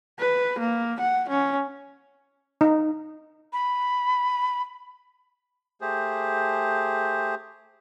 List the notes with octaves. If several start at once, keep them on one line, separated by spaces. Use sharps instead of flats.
B4
A#3
F#5
C#4
D#4
B5
A3 G4 G#4 C5